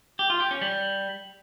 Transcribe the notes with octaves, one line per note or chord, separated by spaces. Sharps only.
G4
F4
G4
C#4
G3